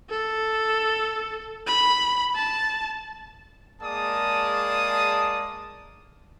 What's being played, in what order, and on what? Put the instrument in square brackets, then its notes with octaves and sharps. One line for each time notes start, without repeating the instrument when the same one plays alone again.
[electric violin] A4
B5
A5
[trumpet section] G#3 A#3 G#4 D5 A5 D#6